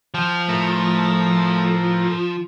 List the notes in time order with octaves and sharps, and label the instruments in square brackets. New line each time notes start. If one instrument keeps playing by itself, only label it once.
[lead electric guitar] F3 [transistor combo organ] G5 F6
[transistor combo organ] A2 A#4 [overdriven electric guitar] A3